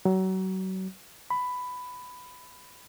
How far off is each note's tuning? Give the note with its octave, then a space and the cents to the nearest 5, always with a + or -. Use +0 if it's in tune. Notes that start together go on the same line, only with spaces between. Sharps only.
F#3 +30
B5 +10